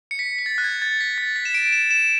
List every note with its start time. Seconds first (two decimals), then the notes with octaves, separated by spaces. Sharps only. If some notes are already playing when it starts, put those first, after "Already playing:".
0.11 C#7
0.19 B6
0.38 B6
0.46 A6
0.58 F#6
0.64 G#6
0.82 A6
1.00 B6
1.18 A6
1.36 B6
1.45 E7
1.54 D7
1.72 E7
1.91 E7